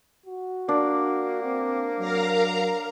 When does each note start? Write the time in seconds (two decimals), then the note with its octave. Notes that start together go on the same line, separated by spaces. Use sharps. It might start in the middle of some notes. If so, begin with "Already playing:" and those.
0.26 F#4
0.69 A#3 D4
1.44 C4
1.99 F#3 A#4 F5 A#5